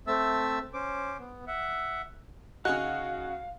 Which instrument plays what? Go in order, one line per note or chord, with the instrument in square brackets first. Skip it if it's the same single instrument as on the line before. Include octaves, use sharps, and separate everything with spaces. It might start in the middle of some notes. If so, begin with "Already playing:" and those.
[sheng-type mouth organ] A3 C4 E5 A5 E6
C#4 C5 D6
B3
E5 F#5
[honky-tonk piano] C#3 F#4 [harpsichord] D#4 G#4 [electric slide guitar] F5 [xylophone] F#6